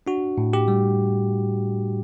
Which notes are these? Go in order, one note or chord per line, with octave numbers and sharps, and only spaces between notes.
D4 F#4
A2
G4
G3